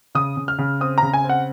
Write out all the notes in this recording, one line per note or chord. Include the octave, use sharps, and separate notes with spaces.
C#3 D#6
C#3
F6
C#3
C4 D#6
C#3 A#5
G#5
C4
F#5